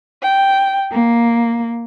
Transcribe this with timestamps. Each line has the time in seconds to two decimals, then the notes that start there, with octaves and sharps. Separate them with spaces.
0.22 G5
0.92 A#3